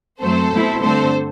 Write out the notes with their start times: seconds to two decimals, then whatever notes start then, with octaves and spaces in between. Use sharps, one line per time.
0.20 F#2 F#3 A3 C4 A4 C5
0.52 B2 A3 C4 E4
0.81 G2 D3 A3 C4 A4 C5